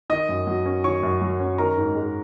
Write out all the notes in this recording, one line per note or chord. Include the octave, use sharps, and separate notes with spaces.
D#3 D#5 D#6
F#2
F#3
C#4
D#3 C#5 C#6
F#2
F#3
C#4
D#3 A#4 A#5
G#2
G#3